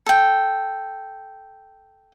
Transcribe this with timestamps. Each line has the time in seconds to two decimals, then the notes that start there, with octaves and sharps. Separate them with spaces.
0.06 A4 G5